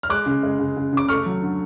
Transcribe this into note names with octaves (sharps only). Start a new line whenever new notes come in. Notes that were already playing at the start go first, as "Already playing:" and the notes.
F6
G#3 D6 F#6
C#3
G#3
C#3
C#3
C#3 D6
A3 C#6 F6
F#3
D3